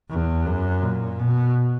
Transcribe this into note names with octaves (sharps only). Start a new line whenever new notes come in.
E2
F#2
A#2
B2